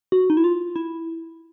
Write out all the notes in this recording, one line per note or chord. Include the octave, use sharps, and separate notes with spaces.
F#4
D#4
E4
F4
E4